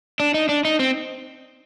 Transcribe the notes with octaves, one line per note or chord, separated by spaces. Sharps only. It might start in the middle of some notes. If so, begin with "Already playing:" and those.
D4
D#4
D4
D#4
C4